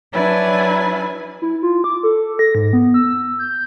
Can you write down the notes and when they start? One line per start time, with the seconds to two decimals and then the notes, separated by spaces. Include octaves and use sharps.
0.12 F#3 D4 E4 B4 G#5
1.42 E4
1.63 F4
1.84 D6
2.03 A4
2.39 A#6
2.55 G#2
2.73 B3
2.94 E6
3.39 G6